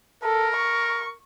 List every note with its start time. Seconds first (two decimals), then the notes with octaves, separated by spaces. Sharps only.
0.23 A4 A#4
0.56 C#6